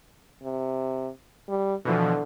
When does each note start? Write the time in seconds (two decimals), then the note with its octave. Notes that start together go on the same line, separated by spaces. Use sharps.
0.43 C3
1.49 G3
1.85 B2 D3 E3 F3